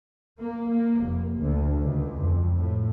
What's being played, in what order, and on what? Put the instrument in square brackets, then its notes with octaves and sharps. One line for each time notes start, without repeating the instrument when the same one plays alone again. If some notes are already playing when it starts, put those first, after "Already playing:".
[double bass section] A#3
A#3
F1
D2
C#2
F2
A2